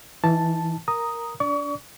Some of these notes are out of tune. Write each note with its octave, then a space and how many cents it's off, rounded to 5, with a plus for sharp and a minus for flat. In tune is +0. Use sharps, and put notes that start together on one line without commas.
E3 +0 D#4 +35 A5 +0
A#4 +0 A#5 +0 D#6 +0
D4 -30 D5 -15 C#6 +35